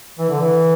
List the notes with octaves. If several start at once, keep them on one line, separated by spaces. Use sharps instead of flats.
E3
D3
E3